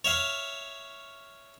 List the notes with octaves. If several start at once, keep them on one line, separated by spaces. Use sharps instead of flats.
C#5 E5 F5